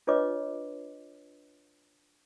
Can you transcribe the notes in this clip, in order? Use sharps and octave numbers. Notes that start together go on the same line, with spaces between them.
D4 F4 B4 C#5 D#5 D6